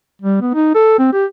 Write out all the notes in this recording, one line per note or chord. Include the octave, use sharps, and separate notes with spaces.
G3
B3
D#4
A4
C4
G4